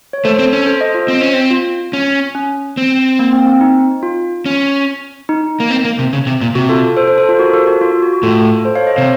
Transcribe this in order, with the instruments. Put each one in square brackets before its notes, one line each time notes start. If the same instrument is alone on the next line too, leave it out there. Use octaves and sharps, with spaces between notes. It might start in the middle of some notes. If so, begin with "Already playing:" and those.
[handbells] C#5
[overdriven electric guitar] A3 [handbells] A4 C5
[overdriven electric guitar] C4
C#4
[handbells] A4 C5
C5 D#5
F4
[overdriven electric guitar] C4
C#4
C4
[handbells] F4
[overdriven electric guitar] C#4
[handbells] C#4
[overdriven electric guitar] C4
[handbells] A#3
C4
C4
D#4
F4
[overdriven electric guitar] C#4
[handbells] D#4
[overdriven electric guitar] A#3
C4
A#3
C3
C#3
C3
A#2
[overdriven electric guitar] C3 [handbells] F#4
[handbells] F4 A4
A4 C5
A4 C5
A4 C5
F4 A4
F#4 A#4
F4 A4
F#4
F4
F4
F#4
F#4
[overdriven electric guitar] A2 [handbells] F4 A4
[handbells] A4 C5
C#5 F5
C5 D#5
[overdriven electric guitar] C3 [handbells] C#5 F5